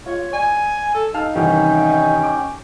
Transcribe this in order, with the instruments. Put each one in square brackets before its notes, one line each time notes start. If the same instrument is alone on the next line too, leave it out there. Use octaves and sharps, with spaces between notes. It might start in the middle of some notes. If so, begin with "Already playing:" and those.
[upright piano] F4 [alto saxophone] C#5
[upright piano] D5 [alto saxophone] G#5
[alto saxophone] A4 [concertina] E6
[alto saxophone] D#4 [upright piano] F5 A5 F6
[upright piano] C2 D#3 E3 [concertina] C#4 G5
[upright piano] D6